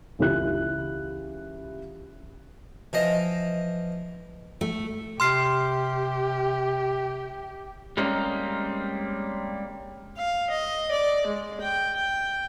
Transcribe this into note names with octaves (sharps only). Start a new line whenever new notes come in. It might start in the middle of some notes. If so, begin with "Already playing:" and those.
C#2 E3 G4 F#6
E3 F3 D#5
A3
C3 G4 C6 F6 C7
G3 G#3 A#3 C4 C#4 D#4
F5
D#5
D5
G#3
G5
G5